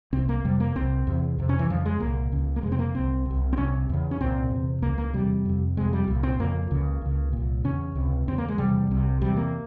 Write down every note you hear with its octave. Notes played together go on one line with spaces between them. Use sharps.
C2 C3 C4
A#3
F2 C3 G3
A#3
C2 C3 C4
E2 C3
F2 C3
C#4
E3
F2 C#3 F3
G#3
C2 A#2 A#3
C#2 C#3
A#3
F2 C3 G#3
C4
A#3
C2 C3 C4
C2 C3
C4
C2 C3 C#4
E2 C#3
C#4
C2 A#2 C4
E2
C3
C#2 C#3 A#3
A#3
E2 C3 G3
F2 C3
F2 C3 G#3
G3
C2 A#2
C4
F2 C#3 A#3
C#2 C#3
C#2 C#3
C2 A#2
E2 C#3 C#4
C#2 C3
E2 C#3 C4
A#3
G#3
E2 C3 G3
C2 C3
E2 C3 G3
A#3